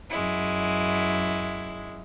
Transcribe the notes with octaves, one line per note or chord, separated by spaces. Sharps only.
F#2 G#3 E4